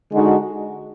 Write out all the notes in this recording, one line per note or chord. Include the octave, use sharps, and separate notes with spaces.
D3 G#3 D#4 F#4